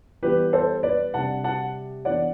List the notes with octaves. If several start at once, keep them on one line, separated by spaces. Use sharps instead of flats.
E3 G3 B3 G4 B4
A4 C5
B4 D5
C3 G3 D4 F#5 A5
F#5 A5
E3 B3 D4 D5 F#5